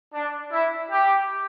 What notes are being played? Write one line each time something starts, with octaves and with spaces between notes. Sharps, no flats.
D4
E4
G4